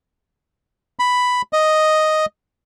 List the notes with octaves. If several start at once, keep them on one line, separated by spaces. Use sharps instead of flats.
B5
D#5